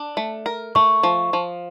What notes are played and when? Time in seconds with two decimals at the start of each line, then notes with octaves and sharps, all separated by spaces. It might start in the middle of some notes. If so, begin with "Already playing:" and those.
Already playing: D4
0.17 A3
0.46 A#4
0.75 A3 C#6
1.03 F3
1.33 F3